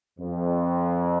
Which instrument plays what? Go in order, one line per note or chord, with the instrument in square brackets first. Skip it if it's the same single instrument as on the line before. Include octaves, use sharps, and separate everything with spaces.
[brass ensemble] F2